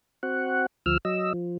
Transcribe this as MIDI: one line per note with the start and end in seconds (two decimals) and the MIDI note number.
0.23 0.66 60
0.23 0.66 66
0.23 0.66 78
0.86 0.97 38
0.86 0.97 53
0.86 0.97 88
0.86 0.97 89
1.05 1.33 54
1.05 1.33 75
1.05 1.33 88
1.34 1.57 53